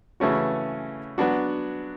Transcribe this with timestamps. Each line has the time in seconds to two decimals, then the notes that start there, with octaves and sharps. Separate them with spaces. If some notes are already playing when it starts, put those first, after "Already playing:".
0.20 C#3 E3 A3 C#4 F#4
1.18 F#3 B3 D4 F#4